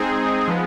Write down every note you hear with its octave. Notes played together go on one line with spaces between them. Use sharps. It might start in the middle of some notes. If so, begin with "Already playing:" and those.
Already playing: G#3 C4 D#4 G#4
F3 G#3 B3